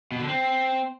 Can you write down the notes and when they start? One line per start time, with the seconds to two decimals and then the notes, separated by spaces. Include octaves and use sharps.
0.12 B2
0.20 D3
0.28 C4